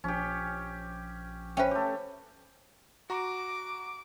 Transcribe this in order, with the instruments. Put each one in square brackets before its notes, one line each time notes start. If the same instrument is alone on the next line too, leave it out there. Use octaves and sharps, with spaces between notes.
[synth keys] A#1 F3 [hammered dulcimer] C#4 G4
[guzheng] C#4 B4 [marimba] C5 E5 G5
[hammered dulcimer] A3 G4
[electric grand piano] F#4 A#5 [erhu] D6